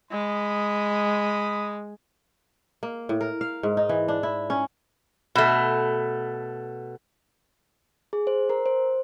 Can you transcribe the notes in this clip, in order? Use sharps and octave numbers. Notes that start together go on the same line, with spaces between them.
G#3 B5 D#6
A#3
A2
A#4
F5
G#2
D#4
E3
D4
E4
C#4
B2 A3
G#4
C5
A#4
C5